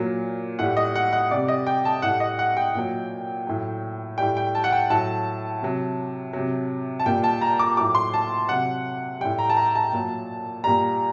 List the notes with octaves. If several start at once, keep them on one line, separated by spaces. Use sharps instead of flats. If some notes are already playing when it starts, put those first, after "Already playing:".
Already playing: A#2 F#3
A2 G3 F#5
D#5
F#5
F#5
C3 G3 D5
D#5
G5
A5
A2 G3 F#5
D#5
F#5
G5
A#2 F#3
A2 F#3
A2 G3 G5
G5
A5
F#5
G5
A2 F#3 A5
C3 F#3
C3 F#3
A5
A#2 G3 G5
A5
A#5
D6
A2 F#3 D6
C6
A5
C3 F#3 F#5
A2 G3 G5
A#5
A5
A#5
A5
A#2 F#3
A#2 G3 A#5